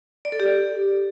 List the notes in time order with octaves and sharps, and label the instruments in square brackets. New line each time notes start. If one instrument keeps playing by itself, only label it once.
[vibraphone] D5
A4
G4